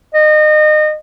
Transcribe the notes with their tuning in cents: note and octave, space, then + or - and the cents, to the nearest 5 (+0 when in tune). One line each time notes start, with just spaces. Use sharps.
D#5 -30